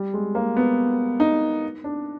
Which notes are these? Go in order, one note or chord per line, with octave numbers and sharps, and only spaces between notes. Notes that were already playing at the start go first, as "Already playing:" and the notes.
Already playing: G3
G#3
A#3
B3
D#4
D4